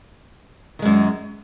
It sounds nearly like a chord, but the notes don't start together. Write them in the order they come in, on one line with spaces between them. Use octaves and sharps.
D#3 G#3 F#2